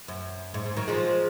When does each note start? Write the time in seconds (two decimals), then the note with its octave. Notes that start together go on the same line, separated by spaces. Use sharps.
0.08 F#2
0.54 G#2
0.66 G#2
0.76 D#3 F#3
0.88 F3 G#3